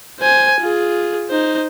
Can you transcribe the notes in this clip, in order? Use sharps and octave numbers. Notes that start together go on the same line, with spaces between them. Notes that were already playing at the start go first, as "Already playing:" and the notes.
C5 G#5
F4 G#4
D#4 C5